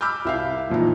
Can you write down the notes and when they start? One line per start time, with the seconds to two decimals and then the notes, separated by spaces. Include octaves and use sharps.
0.01 B5 D6 E6 F6 G6
0.25 C2 E5 F5
0.70 F2 A#2 E3 D#4